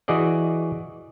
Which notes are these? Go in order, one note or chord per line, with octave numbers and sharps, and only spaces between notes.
E3 F#4 G#4 D5 D#5